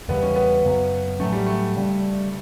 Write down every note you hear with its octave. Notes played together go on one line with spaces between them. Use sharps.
E2 C#3 E3 G3 B3
C#4
B3
F#2 C#3 F#3 B3
A2 F#3 A3 C#4
G3
A3
C#3 G3 B3 D4